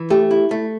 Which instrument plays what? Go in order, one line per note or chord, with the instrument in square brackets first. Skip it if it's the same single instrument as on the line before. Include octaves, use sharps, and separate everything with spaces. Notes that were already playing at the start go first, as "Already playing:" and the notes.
Already playing: [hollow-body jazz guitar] E3
[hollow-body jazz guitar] A3 [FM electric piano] G4
[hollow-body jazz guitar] E4
A3